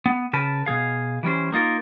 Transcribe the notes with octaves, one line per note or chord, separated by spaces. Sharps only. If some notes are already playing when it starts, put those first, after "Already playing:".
B3
C#3 A#4 B4 A5
B2 G3 G#4 F5
E3 G3 C#4 C5
A#3 D#4 F4 A#4